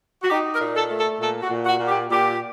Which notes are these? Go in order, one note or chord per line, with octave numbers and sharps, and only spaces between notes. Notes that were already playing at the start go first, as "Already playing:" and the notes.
F#4
D#4 G4
A#4
A#2
A4
A3
A4
A#2 A4
F#4
A#2
F#4
A#2
G4
A#2 G4